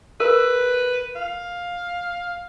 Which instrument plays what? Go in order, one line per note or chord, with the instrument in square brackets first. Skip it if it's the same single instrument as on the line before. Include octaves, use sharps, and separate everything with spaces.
[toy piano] A#4 [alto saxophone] B4
[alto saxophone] F5